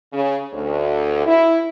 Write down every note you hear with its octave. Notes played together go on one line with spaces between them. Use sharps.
C#3
D2
E4